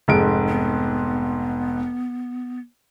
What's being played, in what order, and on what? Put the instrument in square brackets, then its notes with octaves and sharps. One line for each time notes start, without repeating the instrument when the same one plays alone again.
[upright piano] F1 G#2 D7
[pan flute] B3